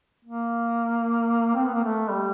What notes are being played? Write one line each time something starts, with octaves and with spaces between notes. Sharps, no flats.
A#3
C4
B3
A#3
A3
G3